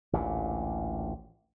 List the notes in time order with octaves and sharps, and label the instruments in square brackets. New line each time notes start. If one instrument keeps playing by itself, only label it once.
[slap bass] A1 D2 A#2